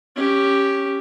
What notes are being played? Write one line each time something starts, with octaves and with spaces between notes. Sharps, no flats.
C#4 G4